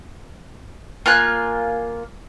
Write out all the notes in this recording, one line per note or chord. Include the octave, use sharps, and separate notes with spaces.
A#3 F4 G#5 F#6